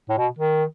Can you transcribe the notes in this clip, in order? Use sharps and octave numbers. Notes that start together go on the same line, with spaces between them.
A2
B2
D#3